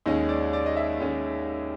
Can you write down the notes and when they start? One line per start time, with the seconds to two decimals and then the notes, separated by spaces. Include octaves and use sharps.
0.06 D#2 D#3 G#3 C#4 D#5
0.29 D5
0.53 D5
0.66 D#5
0.76 E5
1.00 D#2 D#3 G#3 C#4